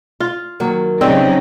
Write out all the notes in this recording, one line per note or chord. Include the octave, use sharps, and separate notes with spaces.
F4
D#3 F#3 A#3
C#3 F#3 C4 D#4 G4 D5 D#5